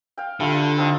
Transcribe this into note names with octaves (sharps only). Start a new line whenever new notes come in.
F5 G5
D3 G3 A3 F4
C4 D#4 F4